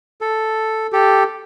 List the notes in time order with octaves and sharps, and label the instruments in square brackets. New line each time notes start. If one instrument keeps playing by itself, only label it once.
[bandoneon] A4
G4 A4